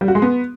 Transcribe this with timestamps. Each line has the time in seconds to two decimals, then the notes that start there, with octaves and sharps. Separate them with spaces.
0.01 G3
0.08 F#4
0.15 G#3
0.22 B3